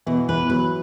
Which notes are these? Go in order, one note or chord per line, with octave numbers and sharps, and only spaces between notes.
B2 E3
E3 B4
F#3 B4